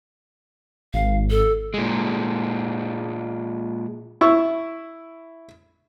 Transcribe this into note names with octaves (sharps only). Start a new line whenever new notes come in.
G#1 F5
A4
A#2 G#3
E4 C#6 E6